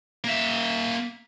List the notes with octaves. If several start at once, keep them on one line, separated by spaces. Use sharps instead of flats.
A#3 E5